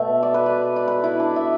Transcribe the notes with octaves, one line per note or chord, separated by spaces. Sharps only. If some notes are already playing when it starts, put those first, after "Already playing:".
Already playing: B2 A3 E5
D5
B4
D5
D5
B4
E4
D4
E5